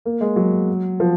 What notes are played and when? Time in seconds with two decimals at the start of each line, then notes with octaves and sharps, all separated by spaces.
0.05 A#3
0.21 G#3
0.36 F#3
1.00 F3